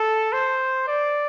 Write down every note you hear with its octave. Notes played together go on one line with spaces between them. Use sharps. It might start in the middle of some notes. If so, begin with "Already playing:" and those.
Already playing: A4
C5
D5